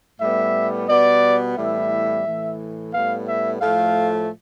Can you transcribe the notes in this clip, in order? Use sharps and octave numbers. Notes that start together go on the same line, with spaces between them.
A2 G3 B3 E5
B2 G3 B3 D5
A2 E3 G3 B3 E5
A2 E3 A3
A2 G3 B3 F5
E5
A2 F3 A3 F5